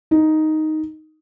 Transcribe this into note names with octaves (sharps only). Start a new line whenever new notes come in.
D#4